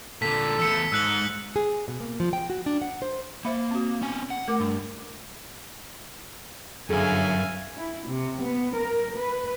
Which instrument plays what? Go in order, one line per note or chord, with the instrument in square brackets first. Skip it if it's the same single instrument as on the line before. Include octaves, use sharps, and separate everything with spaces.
[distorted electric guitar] A#2 D3 [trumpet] A4 [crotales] B6
[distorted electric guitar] E2 A3 [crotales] E6 C#7
[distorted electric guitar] G#2 [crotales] E6 F#6 F#7
[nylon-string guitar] G#4
B2
A#3
F3
G5
F#4
D4
F#5
C5
[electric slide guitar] A#3 [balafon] C5 E5 B5
[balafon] C4 F#4
[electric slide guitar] B3 C#4 G#5
F#5
[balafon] A3 A#4 D6
[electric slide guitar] G2 [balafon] D4
[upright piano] G1 G#4 [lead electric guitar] F#2 [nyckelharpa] E5 F5 [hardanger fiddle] G#5
[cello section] E4
C3
B3
A#4
B4